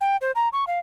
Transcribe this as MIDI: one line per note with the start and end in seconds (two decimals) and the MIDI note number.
0.01 0.17 79
0.21 0.32 72
0.36 0.49 82
0.53 0.65 85
0.67 0.79 77